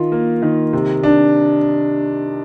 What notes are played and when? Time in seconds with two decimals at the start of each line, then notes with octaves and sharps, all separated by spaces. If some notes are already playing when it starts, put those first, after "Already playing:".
Already playing: D#3 F4
0.12 A#3
0.42 D#3
0.73 C3
1.03 D4